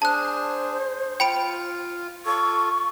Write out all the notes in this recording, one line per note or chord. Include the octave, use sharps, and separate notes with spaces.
D4 G#4 C5 A5 F#6
F4 G5 B5 D7
F4 A4 C#6